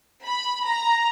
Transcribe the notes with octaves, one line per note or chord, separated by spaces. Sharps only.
B5
A#5